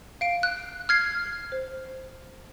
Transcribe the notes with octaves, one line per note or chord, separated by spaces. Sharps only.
F5 D7
F#6
F6 G#6 C7
C5